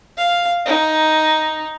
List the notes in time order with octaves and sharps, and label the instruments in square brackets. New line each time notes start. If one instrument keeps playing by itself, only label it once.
[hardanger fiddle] F5
D#4